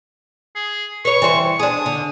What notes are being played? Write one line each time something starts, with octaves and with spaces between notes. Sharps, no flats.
G#4
B4 C#5 C#6
E3 G3 C5
D4 G#4 D#6
D3